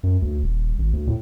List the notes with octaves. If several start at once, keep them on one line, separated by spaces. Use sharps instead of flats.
F#2
D2
D#1
G#1
D2
A2